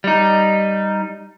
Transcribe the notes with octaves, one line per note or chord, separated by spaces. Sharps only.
G3 D#4